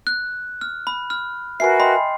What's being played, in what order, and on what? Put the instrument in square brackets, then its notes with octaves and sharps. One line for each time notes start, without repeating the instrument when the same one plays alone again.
[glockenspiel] F#6
F6
B5
F6
[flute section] F#4 A#4 B4 [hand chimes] E5 G#5 B5 [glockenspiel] C7
[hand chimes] D#5 G5 C6 [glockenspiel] B5